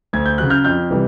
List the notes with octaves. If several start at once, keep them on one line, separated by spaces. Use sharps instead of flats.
D2 G#6
G6
C#3 F#3 F#6
F6 G6
F2 F6 G6
C3 E3 G3